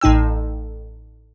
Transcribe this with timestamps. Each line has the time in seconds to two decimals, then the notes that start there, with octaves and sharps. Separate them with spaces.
0.01 A1 A2 D#4 G5 E6